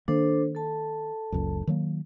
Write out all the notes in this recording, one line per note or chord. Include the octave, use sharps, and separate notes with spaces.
D#3 A#3 D4 A4 C5
A4 A5
F#1 C#2 F#2
D#3 F#3 A#3